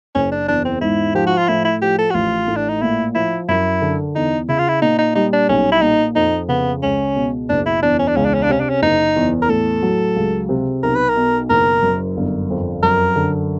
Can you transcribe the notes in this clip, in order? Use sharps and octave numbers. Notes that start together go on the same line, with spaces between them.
F#1 C#4
D4
E2 D4
C4
G#2 E4
F3 G4
F#4
F4
A2 E4
E4
F3 G4
A4
F#4
A1 F4
A2
D4
D#4
A#2 E4
F3 E4
F#2 E4
D3
E2 D#4
C#3 E4
F4
E4
A#2 D#4
D#4
G3 D#4
D4
B1 C#4
E4
A#2 D#4
F2 D#4
C#3 B3
C#2 C#4
B2
F#1 D4
E4
E2 D4
C#4
D4
C#2 C#4
D4
C#4
D4
C3 C#4
D4
C#4
F#1 D#4
E2
A#4
A2 A4
F#3
C#2
C3
B1 A#4
B4
A#4
B2
F#1 A#4
F#2
G1
F2
F#2 A#4
D3